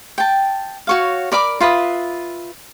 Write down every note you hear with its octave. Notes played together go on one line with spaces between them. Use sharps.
G5 A5
F#4 C#5 F5
A#4 D5 B5 D6
F4 B4 E5 D#6